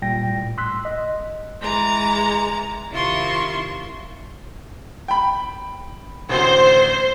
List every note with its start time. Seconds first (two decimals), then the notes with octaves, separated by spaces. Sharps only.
0.02 A#2 G3 G5 A#6
0.29 A2
0.58 C6 E6 F#6 B6
0.85 D#5
1.62 E3 G#3 A#5 A6
2.91 C3 D#3 E4 F4 C6 C#6
5.08 G5 B5
6.29 A1 D2 C5